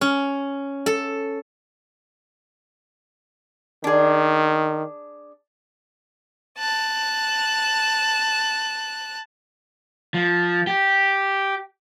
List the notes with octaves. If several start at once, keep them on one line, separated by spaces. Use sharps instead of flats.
C#4
A4
D#3 D4 G#4
A5 F#6
F3
G4